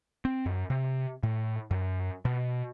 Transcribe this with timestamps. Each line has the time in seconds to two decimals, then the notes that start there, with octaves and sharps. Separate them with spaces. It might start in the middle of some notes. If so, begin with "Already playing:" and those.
0.25 C4
0.46 F#2
0.70 C3
1.23 A2
1.71 F#2
2.25 B2